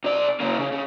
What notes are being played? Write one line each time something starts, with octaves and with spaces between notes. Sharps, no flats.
C3 D5
C#3 A#3
C#3
C#3